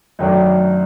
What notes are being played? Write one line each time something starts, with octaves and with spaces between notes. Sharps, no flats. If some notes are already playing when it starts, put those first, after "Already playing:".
F#2 D#3 F#3 A3 D4